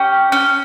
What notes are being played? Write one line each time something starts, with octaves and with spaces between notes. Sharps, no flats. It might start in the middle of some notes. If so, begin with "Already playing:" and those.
Already playing: C#4 G4 G5
C#4